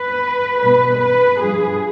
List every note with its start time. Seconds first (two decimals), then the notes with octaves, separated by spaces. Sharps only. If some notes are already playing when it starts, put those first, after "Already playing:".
Already playing: B4
0.60 B2 G3 B4
0.99 B4
1.40 G2 F3 G#4